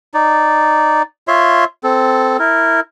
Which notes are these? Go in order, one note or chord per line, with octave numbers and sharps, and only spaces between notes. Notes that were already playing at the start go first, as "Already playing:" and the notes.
D#4 D5
F4 C#5 E5 C6
C4 A4
E4 A#4